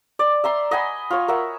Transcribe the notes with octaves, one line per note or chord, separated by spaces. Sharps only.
D5
E5 A#5 C6
D#5 F#5 G#5 B5
F4 C#5
A#4 E5 F#5